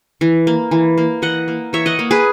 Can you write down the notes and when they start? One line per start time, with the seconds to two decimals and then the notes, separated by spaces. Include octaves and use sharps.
0.21 E3
0.47 A#3
0.71 E3
0.98 A#3
1.22 E3 D#5 F#5
1.48 A#3
1.73 E3 C#5 E5
1.86 D#5 F#5
1.99 A#3
2.11 G#4 B4